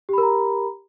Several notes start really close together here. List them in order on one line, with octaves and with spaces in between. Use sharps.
G4 B5 A#4 A#5